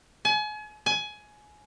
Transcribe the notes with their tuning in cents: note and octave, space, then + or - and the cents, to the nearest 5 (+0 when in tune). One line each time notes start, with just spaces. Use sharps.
G#5 +35
G#5 +20